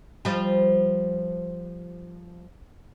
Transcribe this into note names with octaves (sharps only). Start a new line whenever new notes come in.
F3 G3